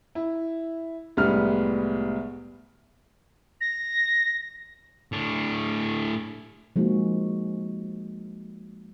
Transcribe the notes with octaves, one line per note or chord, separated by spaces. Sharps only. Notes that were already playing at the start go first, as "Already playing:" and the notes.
E4
C2 A2 G3 G#3 B3 F6
A#6
A2 D4
F3 G#3 A#3 D#4 F#4